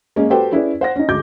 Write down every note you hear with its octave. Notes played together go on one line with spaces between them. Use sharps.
G#3 A#3 C#4 D#5
F#4 G4 A4 B4 C5 G5
C#4 E4 G#4 B4 D5
C5 F#5 A#6
C#4 D#4
D2 G#3 G#4 D6 G6